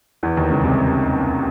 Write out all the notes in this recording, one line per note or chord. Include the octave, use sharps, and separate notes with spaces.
E2 E3
D#2 D#3
C#2 C#3
C2 C3